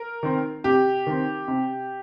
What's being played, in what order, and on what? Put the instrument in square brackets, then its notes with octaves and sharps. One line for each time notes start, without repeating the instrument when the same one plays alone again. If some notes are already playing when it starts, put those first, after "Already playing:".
Already playing: [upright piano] A#4
[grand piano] D#3 C4
[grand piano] C3 [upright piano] G4
[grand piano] D#3 C4
C3